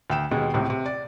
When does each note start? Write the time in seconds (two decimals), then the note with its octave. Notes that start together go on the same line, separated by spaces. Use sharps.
0.10 D2 G5 E7
0.31 D#2 B2 G#3
0.54 C#2 A2 C3
0.70 C3
0.86 D5